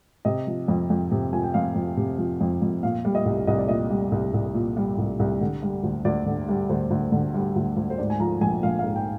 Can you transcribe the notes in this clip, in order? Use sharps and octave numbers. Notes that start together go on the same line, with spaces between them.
C3 D#5
F3
F2
F2
C3
F3 G#5
G5
F2 F5
F2
C3
F3
F2
F2
A#2 F5
G3
D#5
C2
C2 D#5
D5
A#2 D#5
G3
C2
C2
A#2
G3
C2
C2
D3
G3
D2
D2 D5
D3
G3
D2 C5
D2
D3
G3
D2
D2
C5
G#2 D5
G#5
F3 A#5
A#1 G#5
A#1 F5
G#2 F5
G5